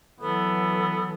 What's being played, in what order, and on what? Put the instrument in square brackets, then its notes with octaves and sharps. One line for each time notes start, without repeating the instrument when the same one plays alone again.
[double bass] E3 F#3 [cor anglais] B3 [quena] A4